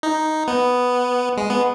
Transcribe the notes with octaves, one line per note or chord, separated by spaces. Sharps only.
D#4
B3
G#3
B3